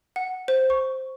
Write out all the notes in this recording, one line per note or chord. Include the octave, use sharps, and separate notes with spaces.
F#5
C5
C#6